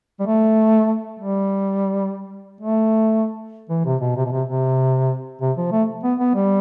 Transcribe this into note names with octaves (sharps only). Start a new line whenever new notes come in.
G3
A3
G3
A3
E3
C3
B2
C3
B2
C3
C3
C3
F3
A3
B3
B3
G3